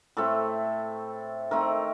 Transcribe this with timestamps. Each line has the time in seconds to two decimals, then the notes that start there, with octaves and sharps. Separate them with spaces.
0.17 A2 A3 C4 A4
1.51 D#3 A3 C4 A#4